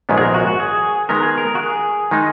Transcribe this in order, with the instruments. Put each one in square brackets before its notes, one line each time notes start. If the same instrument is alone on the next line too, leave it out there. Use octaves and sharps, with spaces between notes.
[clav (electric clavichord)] A#1 G#2 D#3 G#3 B3
[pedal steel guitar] G#4
A#4
F#4
F#4
G#4
[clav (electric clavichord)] D#3 G#3 B3 [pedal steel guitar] A#4
[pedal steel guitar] G#4
A#4
F#4
G#4
[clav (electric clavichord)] D#3 G#3 D#4